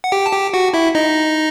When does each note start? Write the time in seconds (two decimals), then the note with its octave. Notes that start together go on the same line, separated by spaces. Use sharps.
0.04 F#5
0.12 G4 G5
0.26 A5
0.32 G4 G5
0.53 F#4 F#5
0.74 E4 E5
0.95 D#4 D#5